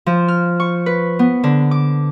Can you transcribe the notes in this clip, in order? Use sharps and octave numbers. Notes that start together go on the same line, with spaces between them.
F3
F6
C#6
B4
B3
D3
D6